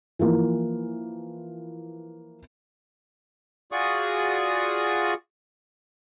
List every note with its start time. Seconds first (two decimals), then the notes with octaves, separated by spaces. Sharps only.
0.19 E3 F3 A#3
3.72 F4 F#4 G#4 D5 C#6 D#6